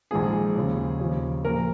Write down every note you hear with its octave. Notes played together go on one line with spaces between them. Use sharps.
A#1 G#2 F3 G#4
D#2 C#3 F3
D#2 C#3 F3
A#1 A#2 F3 A#4